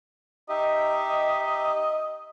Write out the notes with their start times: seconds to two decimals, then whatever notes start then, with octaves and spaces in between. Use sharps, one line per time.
0.49 D#4 G4 D#5 E5